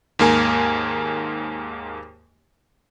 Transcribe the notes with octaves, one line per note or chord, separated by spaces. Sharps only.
D#2 G#2 A#3 A#4 G#5